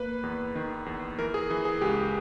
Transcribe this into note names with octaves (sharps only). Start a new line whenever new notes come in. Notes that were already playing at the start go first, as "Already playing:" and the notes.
Already playing: A#3 B4
E2
D#3
E2
E3 A#4
G#4
E3
G#4
C#2 G4